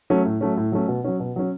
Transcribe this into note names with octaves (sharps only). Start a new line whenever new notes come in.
F#3 A3 C#4
A2
F#3 A3 C#4
A2
F#3 A3 C#4
B2
F#3 C#4
B2
F#3 C#4